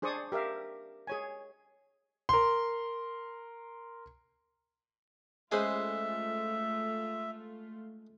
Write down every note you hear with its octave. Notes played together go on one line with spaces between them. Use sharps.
D4 G#4 C5 D5 C#6 D#6
G4 A#4 E5 F5
G#4 C#5 G#5
A#4 C6
G#3 A3 C#4 F4 G#4 B4 C5 E5